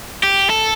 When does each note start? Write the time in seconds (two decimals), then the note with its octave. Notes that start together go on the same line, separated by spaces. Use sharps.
0.23 G4
0.50 A4